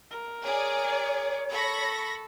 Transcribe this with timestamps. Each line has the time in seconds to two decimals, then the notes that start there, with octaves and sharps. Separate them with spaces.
0.11 A#4
0.44 G#4 C#5 D5
1.51 A4 B5 C#6 A#6